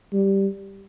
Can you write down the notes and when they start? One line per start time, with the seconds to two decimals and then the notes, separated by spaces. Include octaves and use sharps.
0.13 G3